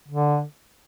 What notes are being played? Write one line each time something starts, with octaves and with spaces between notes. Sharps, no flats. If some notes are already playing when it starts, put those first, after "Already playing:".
D3